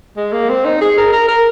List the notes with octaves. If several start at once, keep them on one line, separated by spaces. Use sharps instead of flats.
G#3
A#3
C4
D#4
G#4
A#4
A#4
A#4